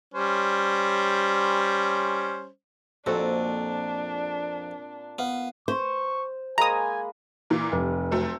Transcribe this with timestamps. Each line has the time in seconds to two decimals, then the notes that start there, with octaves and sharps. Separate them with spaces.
0.14 G3 C#4 C5
3.06 F2 A#2 C4 D4 F#4 A4
5.19 B3 F5
5.68 C5 C#6
6.58 G#3 A#3 G#5 A#5 B5 D#6
7.50 A#2 E3 A#3
7.72 F1 G3
8.12 F#3 A3 C4